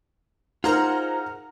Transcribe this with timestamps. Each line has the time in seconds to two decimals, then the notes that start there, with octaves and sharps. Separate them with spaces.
0.64 D#4 F4 G#4 A#4 C5 F#5 A#5 F6